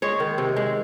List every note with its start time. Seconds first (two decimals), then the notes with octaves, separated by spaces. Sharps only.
0.02 G#3 C#5
0.20 D#3
0.38 C3
0.56 G#3